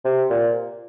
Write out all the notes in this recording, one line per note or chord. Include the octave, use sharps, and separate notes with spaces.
C3
A#2